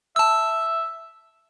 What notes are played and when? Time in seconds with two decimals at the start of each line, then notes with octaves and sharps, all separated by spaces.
0.16 E5 A5 E6